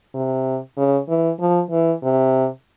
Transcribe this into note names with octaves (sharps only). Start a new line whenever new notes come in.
C3
C#3
E3
F3
E3
C3